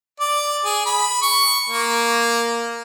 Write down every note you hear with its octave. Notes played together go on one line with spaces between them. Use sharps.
D5
G#4
B5
C#6
A#3